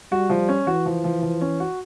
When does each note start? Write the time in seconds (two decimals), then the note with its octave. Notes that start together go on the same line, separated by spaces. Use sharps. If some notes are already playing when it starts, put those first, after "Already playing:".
0.12 G3 F#4
0.30 F3
0.49 C#4
0.67 E3 F#4
0.86 F3
1.04 F3
1.22 F3
1.41 C#4
1.60 F#4